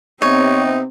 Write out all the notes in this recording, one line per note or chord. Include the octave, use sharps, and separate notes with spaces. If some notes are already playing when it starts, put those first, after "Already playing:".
C3 B3 C4 D#4 C#5